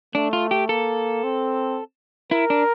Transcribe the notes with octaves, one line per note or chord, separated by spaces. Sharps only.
A3 D4
F4
G4
A#3 A4
C4
E4 A#4
D4